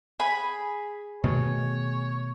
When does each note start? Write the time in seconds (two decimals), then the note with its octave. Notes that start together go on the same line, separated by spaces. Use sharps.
0.20 G#4 B5
1.24 B2 D#3 A3 C#5